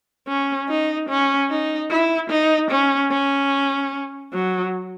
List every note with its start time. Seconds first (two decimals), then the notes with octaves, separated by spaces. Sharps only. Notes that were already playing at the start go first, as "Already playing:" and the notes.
0.28 C#4
0.69 D#4
1.09 C#4
1.50 D#4
1.91 E4
2.30 D#4
2.70 C#4
3.11 C#4
4.33 F#3